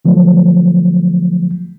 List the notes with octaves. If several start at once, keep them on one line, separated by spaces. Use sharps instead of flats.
D3 F3 F#3 A3